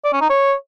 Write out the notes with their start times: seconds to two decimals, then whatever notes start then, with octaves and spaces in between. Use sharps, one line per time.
0.04 D5
0.13 C#4
0.21 D#4
0.30 C#5